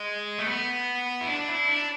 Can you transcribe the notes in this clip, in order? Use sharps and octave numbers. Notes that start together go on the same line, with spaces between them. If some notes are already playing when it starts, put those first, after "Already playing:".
Already playing: G#3
A3
B3
E4
D4
E4
D4